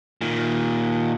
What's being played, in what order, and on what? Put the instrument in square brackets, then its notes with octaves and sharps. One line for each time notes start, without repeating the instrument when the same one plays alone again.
[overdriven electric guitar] A#2 D#3